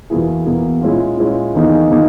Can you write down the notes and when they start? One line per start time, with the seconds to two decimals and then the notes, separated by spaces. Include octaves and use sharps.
0.10 E2 B2 A#3 E4 G#4
0.45 E2 B2 A#3 E4 G#4
0.81 A#2 G#3 C#4 E4 G#4
1.17 A#2 G#3 C#4 E4 G#4
1.54 E2 D#3 A#3 D#4 G#4
1.90 D#3 A#3 D#4 G#4